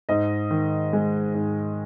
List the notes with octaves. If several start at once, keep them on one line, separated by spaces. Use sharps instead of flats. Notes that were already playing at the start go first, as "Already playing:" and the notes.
G#2 D#5
D#3
G#3
G#2